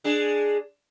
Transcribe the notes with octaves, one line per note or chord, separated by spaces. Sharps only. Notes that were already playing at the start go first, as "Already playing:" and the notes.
G#3 D4 G#4